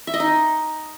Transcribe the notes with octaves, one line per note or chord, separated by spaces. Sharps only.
E5
D#5
D#4